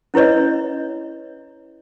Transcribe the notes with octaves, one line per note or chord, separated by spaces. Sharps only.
C#4 E4 B4 C#5 D#5